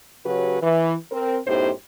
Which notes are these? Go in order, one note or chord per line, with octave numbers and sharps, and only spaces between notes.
C#3 F#3 C#4 F#4 G4 B4
E3
C4 A#4 C5
F#2 A2 B3 D#4 G4 C5